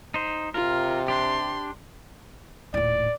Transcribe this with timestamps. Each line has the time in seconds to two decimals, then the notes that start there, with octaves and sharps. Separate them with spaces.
0.14 D#4 C5
0.54 C3 F4 A#4
1.08 D4 G4 C6
2.74 D#1 A2 D5